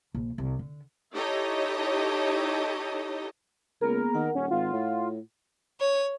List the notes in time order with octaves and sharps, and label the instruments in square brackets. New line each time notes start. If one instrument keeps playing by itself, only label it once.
[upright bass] A#1
C2
D3
[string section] D#4 E4 G4 A4 C#5 D#5
[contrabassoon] C#2 [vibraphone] A#3 B3 G#4 [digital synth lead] A#4
[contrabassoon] D#3 [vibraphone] F#5
[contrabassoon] D#1 [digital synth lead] C#4
[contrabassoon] G#1 [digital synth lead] F4
[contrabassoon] A2
[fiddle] C#5